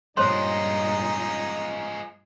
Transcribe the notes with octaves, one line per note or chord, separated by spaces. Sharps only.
G2 A#2 F3 G#3 D#4 C5 C#5 C6